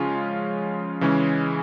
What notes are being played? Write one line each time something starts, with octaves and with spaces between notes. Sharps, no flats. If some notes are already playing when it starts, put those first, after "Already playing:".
Already playing: C#3 F3 G#3 C#4 F4
C#3 E3 G#3 C#4